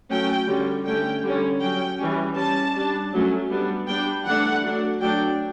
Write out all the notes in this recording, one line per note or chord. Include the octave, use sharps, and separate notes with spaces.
F#3 A3 C#4 G5
D3 G3 C#4
D3 A3 C#4 G5
D3 G3 C#4
F#3 C#4 G5
E3 G3 C#4
G3 C#4 A5
G3 D4
F#3 A3 C#4
G3 B3 D4
G3 B3 D4 G5
E3 A3 D4 F#5
F#3 A3 D4
F#3 A3 D4 G5